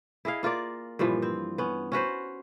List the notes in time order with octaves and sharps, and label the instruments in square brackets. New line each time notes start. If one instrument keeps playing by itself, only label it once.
[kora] E4 G#4 D#5 F5
A#3 F4 A#4 D5
G2 A#2 E3 F3
C4
B3 C#4
C#4 F#4 B4 C5